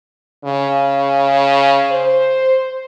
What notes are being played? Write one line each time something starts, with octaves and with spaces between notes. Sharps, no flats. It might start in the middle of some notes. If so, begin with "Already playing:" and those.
C#3
C5